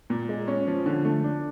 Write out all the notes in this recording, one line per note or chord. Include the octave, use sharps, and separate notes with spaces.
A#2
G#3
C#4
F3
D3
A3
D4